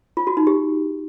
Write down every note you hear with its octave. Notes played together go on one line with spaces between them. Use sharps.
F4
F#4
D#4
G4